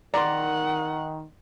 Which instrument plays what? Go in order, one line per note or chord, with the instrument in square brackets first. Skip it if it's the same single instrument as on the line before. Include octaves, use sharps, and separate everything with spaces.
[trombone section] D#3 [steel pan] D5 [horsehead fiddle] F#5 [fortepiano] A#5 C6